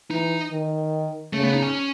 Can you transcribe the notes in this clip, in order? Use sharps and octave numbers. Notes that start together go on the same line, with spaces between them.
E3 D#4
D#3
C#3 A3
B3
D#4
C#4